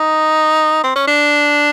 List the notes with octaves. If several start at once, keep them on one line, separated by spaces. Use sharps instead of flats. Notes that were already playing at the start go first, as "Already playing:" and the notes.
Already playing: D#4
C4
C#4
D4